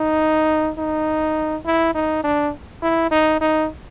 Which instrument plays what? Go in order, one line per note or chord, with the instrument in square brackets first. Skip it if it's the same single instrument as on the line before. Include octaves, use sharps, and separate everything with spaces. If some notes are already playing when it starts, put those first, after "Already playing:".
Already playing: [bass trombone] D#4
D#4
E4
D#4
D4
E4
D#4
D#4